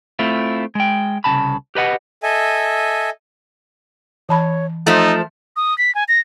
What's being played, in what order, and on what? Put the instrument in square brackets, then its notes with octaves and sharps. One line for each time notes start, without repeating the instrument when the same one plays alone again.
[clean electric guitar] A3 C4 E4 F4
G#3 G5
C2 C#3 A5 B5
G4 B4 D#5 F#5
[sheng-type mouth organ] A4 D#5 E5 G#5
[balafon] E3 A5 B5 [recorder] C#5
[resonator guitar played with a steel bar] F3 A3 [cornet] D#4 [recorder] C5
[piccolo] D#6
B6
G#5
A#6